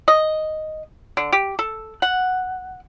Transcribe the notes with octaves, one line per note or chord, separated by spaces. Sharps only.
D#5
D3
G4
A4
F#5